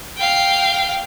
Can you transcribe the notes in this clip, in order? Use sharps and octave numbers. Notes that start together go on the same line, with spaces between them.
F5 G5